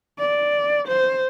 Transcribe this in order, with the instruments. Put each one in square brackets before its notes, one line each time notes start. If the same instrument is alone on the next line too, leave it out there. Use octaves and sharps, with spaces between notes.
[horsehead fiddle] D5
C5